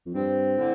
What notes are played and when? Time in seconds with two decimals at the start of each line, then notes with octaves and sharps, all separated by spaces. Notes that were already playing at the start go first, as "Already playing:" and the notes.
0.06 F2
0.14 G2 C4
0.57 A2 D3